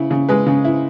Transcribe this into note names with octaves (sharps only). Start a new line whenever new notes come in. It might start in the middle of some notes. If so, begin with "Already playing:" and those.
Already playing: C#3 E4
C#3
G#3 B4
C#3
E4